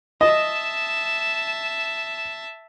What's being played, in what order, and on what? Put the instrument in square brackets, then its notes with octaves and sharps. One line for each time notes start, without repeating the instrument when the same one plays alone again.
[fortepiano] D#5 [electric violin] E5 A5